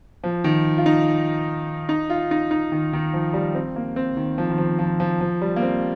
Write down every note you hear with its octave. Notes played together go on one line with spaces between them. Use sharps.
F3
D#3
F4
D#4
D#4
F4
D#4
D#4
D#3
D#3
F3
G3
C4
A#3
C4
D#3
F3
D#3
F3
F3
F3
F3
G3
A#3
C4